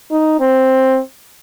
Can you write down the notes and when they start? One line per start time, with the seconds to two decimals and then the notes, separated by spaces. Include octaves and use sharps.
0.11 D#4
0.40 C4